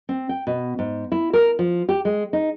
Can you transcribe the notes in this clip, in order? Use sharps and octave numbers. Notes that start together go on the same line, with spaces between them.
C4
G5
B2
G#2
E4
A#4
F3
G4
G#3
D#4